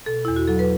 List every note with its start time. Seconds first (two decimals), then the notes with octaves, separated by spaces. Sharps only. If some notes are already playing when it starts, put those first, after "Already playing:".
0.06 B2 A4
0.25 E2 E4
0.36 F#4
0.48 F#3 A4
0.59 B4